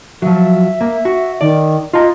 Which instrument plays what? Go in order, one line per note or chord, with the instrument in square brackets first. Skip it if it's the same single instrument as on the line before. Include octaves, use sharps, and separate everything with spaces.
[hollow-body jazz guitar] F3 F#3 [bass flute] E5
[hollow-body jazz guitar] A#3
F#4
[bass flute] D#3 [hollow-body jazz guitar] D5
[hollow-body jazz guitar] F4 A#5 [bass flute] D#5